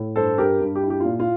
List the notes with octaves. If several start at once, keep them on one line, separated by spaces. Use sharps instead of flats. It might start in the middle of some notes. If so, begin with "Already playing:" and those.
Already playing: A2
G2 A4 C5
G2 G4 A#4
G2
G4
E4
G4
A#2 F4
F4